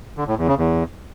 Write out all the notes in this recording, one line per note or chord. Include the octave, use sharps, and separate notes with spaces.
D3
A2
E2
C#3
E2